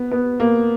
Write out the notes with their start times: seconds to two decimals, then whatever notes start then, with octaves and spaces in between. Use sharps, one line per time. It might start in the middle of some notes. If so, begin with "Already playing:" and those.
Already playing: B3
0.11 B3
0.40 A#3